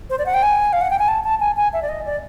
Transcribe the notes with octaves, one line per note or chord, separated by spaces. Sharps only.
C5
D5
F#5
G5
G#5
F5
F#5
G5
G#5
A5
A5
G#5
G#5
E5
D5
D#5
D5